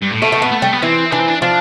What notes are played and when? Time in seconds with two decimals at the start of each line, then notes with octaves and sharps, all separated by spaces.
0.02 G2
0.12 A2
0.22 B2 A3
0.32 A3
0.42 B3
0.52 A3
0.62 G3
0.73 B3
0.83 E3 C4
1.11 E3 D4
1.20 C4
1.28 D4
1.42 F3 D4